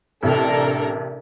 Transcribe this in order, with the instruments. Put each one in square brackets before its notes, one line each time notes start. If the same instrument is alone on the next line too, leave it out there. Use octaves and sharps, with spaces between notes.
[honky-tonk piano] A1 C3 [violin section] D4 A4 A#4